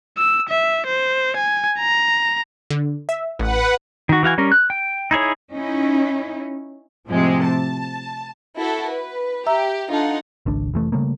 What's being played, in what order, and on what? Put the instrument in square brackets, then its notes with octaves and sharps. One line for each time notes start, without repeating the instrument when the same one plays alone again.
[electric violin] E6
E5
C5
G#5
A#5
[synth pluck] D3
E5
[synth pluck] A1 [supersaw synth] B4 F#5
[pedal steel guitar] D#3 F#4
E3 F#4 F5 G#5
G3 C#4 A#4
F#6
G5
D#4 E4 G#4 C#5
[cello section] C#4 D#4 E4
[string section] A2 C3 F3 G#3
A5
[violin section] E4 F#4 A4
B4
[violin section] G4 [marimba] E5 A#5 E6
[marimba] D4 A4 A5 [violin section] D#4 F4 F#5
[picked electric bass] G#1 C#2 D4
F1 E3 A3
C#3 G3 A3 A#3